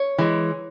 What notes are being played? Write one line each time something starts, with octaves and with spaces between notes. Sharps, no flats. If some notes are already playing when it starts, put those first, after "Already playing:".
Already playing: C#5
E3 G#3